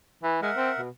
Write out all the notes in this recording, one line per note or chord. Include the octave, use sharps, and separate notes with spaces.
E3
G#3 A#4 E5 F#5
C4
B2